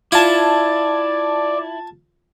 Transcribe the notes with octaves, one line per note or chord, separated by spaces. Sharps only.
E4 F4 D5 A5 G#6